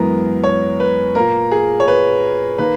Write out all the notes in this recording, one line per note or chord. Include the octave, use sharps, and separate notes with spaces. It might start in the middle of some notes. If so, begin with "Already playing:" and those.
Already playing: F#2 E3 G#3 B3 A#4
C#5
B4
A#2 A#3 A#4
G#4
C#5
B4
D#3 A#3 B4